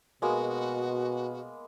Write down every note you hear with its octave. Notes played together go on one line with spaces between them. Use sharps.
B2 G#3 A#3 B3 F#4